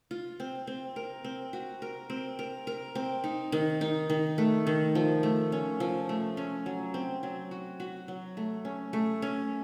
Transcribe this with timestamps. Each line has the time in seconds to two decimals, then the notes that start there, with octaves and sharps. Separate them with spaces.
0.11 F4
0.40 C4
0.67 C4
0.96 A#4
1.24 C4
1.53 F#4
1.82 A#4
2.10 C4
2.39 A#4
2.67 A#4
2.95 C4
3.24 D#4
3.52 D#3
3.81 D#4
4.09 D#3
4.38 A3
4.67 D#3
4.95 F3
5.23 A3
5.52 C#4
5.80 F3
6.09 A3
6.37 C#4
6.66 F#3
6.94 C4
7.23 F#3
7.51 F#4
7.80 F#4
8.08 F#3
8.37 A3
8.65 C#4
8.93 A3
9.22 C#4